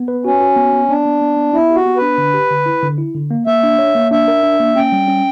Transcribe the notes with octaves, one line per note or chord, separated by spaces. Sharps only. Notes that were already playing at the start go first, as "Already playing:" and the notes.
Already playing: B3
B4
C#4 F#4
F#4
B3
B3
B3 D4
B3
B3
B3
B3 E4
G4
F#4
B3
D4 B4
D3
G4
D3
E4
D3
E4
D3
A#3
A#3 E5
D4
C#5
A#3
D4 E5
A#4
D4
A#3
C#4 G5
G3
C#4